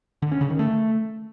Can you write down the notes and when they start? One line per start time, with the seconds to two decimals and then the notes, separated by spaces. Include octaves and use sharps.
0.22 D3
0.32 C#4
0.41 C#3
0.50 D#3
0.59 A3